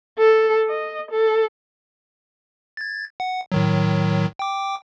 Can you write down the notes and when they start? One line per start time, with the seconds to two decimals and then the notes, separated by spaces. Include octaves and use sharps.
0.19 A4
0.69 D#5
1.11 A4
2.77 G#6 A6
3.20 F#5
3.52 A2 D#3 F#3
4.39 G5 D6